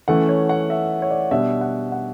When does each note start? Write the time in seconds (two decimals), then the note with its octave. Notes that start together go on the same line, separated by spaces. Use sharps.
0.08 E3 A3 C#4 F#5
0.29 C#5
0.49 F#5
0.70 E5
1.02 C#5
1.11 D5
1.31 B2 G3 D4 E5
1.61 F#5
1.92 F#5